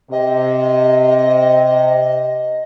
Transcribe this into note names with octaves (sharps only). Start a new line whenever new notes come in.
C3 D#5